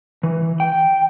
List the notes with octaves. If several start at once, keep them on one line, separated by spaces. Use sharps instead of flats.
E3
G5